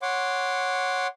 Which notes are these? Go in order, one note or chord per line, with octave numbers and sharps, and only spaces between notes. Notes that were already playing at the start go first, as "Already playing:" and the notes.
C#5 F#5 C6 D6